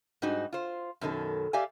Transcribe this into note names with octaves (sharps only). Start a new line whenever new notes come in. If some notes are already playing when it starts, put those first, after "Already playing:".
G#2 G3 D#4 F#4
F4 C5
F#2 B2 D#3 A4
G4 D5 E5 F5 G#5